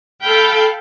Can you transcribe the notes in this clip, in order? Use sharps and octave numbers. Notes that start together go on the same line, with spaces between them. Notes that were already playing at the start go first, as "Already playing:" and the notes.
A4 F5 G5 B5